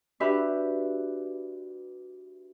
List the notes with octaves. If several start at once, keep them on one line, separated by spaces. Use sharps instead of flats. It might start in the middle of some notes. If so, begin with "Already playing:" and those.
D4 F#4 G4 B4 E5